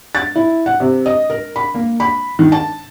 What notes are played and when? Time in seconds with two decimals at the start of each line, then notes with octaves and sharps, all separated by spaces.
0.15 A6
0.36 E4
0.66 F#5
0.80 C3
1.06 D#5
1.30 A#4
1.56 B5
1.74 A#3
2.00 B5
2.39 D#3
2.52 A5